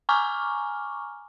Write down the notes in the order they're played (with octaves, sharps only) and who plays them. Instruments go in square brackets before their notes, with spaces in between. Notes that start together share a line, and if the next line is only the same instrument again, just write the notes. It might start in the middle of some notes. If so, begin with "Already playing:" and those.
[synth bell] G#5 A#5 C#6 D6 F6